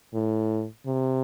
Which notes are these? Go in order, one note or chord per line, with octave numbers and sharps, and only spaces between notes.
A2
C3